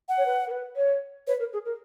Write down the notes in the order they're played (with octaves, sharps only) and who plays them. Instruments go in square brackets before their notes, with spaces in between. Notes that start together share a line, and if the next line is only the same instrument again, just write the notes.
[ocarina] F#5
[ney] C#5
B4
A#4
B4
C#5
[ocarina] B4 [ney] C#5
[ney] A#4
G#4
A#4